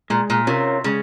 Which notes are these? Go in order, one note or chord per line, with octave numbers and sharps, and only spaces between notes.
A#2 G#3
A#2
C3 C#4 F4 A#4 C#5
C#3 G#3